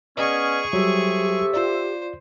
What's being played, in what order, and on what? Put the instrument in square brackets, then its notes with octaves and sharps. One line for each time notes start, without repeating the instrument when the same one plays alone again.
[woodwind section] B3 C#4 [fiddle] G#4 C#6 [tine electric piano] D5 D#5 D#6
[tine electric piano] F#3 G3 [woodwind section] C4 A4 E5 [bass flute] G4
[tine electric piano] F4 D5 [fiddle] C5